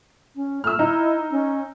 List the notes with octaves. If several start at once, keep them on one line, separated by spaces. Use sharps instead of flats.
C#4
A3 E6 F6
D#4 E4
C#4